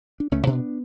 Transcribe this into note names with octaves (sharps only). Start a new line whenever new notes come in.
D4
C#2 A3 C#4
B2 B3 D4